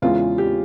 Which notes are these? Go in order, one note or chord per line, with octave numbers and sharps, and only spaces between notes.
E2 C#3 E3 G#3 F4
G4